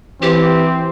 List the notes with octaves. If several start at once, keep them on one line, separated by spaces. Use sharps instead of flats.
E3 C4 G4